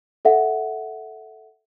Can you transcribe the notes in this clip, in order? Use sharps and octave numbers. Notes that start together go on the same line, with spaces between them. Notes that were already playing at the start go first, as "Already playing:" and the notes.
A4 E5 F#5